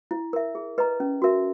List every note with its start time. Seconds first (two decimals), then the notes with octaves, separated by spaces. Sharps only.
0.11 E4
0.33 A#4 E5
0.55 G#4
0.78 B4 D#5 A#5
1.00 C#4
1.22 F#4 A#4 E5